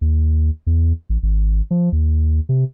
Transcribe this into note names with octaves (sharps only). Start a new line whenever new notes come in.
D#2
E2
A1
G#1
F3
D#2
C3